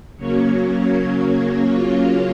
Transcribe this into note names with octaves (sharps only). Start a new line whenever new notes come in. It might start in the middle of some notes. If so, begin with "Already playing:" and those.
C#3 F#3 A#3 C#4 C#5
F4